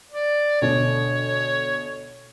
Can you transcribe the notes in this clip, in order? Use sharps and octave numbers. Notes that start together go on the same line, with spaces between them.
D5
D2 B2 C#5